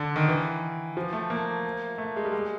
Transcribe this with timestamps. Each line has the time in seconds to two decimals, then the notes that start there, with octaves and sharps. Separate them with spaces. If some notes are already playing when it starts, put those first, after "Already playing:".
Already playing: D3
0.16 D#3
0.28 E3
0.97 F3
1.13 A3
1.30 A#3
1.98 A3
2.16 G#3
2.25 G3
2.33 G#3